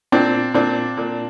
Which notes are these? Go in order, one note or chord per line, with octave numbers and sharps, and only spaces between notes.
A#2 C4 D4
A#2 C4 D4
A#2